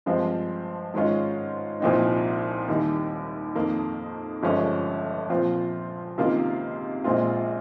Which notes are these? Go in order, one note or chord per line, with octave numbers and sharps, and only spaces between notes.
G2 F3 G#3 C4
G#2 D#3 G#3 C#4 F4
C2 A#2 F3 C4 D#4
D#2 D#3 G3
F2 D#3 A#3
G1 G2 F3 G#3 C#4
A#2 F3 C4 F4
C#2 C3 D#3 A#3 F4
A#1 A#2 G#3 C4 F4